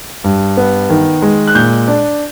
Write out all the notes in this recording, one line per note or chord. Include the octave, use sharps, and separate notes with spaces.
G2
B3
D#3
G#3
F#6
A#2 G6
D4